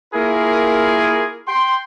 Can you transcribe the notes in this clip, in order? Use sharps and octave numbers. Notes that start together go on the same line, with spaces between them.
A#3 E4 F4 G#4 A#4
G5 C6